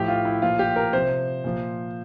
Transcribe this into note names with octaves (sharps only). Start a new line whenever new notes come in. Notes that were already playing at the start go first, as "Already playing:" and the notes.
Already playing: A2 F3 G4
F4
E4
A#2 F3 F4
G4
A#4
C3 F3 C5
A#2 F3